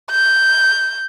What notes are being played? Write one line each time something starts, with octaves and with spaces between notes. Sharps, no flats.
G6